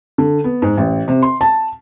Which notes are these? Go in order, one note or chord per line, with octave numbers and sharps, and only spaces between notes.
D3
B3
G#2
A1
C3
C6
A5